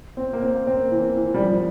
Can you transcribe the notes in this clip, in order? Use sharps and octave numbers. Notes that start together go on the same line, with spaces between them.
C4
A#3
C4
A#3
C4
E3
E3
G3
F3